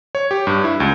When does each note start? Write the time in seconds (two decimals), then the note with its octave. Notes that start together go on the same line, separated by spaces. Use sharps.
0.15 C#5
0.31 G4
0.47 G2
0.64 E4
0.80 C#2